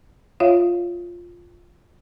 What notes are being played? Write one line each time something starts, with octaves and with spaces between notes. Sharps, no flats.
F4 C#5 E5 F5